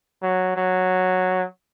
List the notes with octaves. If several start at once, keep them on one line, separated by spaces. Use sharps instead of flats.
F#3
F#3